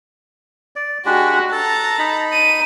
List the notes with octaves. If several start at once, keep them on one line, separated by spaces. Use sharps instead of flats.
D5
G#3 D4 F#4 G4
A4 A5 A#5
D#4 B5
D#7